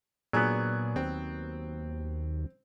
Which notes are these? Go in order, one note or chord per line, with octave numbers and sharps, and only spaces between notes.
A#2 F#3 B3 D4 G#4 F#6
D#2 C4